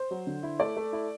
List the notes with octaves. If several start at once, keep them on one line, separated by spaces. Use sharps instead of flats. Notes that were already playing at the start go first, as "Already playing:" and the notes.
Already playing: C5
F#3
D3
E4
A3 D5
A3
E4